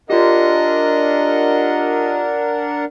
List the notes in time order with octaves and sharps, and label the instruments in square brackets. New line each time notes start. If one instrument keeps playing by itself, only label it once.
[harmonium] D4 A#4 F#5 [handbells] F4 G4 [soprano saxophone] D#5